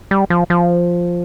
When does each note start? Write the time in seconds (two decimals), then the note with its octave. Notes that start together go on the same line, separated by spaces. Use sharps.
0.11 G3
0.30 F3
0.50 F3